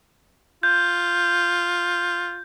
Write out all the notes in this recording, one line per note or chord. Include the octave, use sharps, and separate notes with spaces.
F4 G6